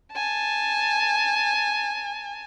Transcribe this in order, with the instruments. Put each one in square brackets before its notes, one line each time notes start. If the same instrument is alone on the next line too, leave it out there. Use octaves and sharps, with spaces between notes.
[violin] G#5 A5